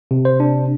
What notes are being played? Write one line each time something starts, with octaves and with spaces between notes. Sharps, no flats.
C3
C5
D4